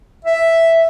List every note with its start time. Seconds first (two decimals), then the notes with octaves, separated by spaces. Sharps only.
0.25 E5